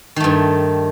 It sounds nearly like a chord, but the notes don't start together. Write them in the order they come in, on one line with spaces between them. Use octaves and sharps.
D#3 A3 G2